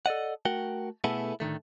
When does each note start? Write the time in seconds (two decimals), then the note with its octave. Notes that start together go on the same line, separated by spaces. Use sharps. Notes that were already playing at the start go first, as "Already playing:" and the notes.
0.06 A4 D5 D#5 F#5
0.45 A3 F#4 A#4 F#5 G5
1.04 B2 A3 B3 E4 G#4 A4
1.40 A2 D3 D#3 A3